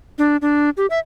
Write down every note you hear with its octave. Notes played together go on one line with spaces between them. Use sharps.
D4
D4
G4
E5